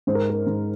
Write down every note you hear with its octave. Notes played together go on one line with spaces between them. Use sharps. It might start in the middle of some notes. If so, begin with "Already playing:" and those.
G#2 C5
A#4
A#4
G#2